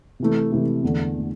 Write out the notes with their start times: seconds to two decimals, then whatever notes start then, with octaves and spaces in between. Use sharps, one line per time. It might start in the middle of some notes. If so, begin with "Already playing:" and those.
0.20 C3 E3 A3
0.52 C3 E3 A3
0.83 E2 D3 A3
1.16 D3 A3